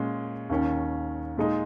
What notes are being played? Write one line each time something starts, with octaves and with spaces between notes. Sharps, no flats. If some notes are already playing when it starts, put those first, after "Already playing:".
Already playing: A#2 G#3 C#4
D#2 D#3 C#4
A#2 G#3 D#4